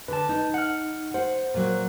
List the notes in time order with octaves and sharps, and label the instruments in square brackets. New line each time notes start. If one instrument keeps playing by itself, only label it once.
[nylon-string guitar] D3 [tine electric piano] B4 A5
[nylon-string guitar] D#4
[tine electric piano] F#5 F6
[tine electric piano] C5 [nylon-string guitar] F#5
[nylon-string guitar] A#2 F#3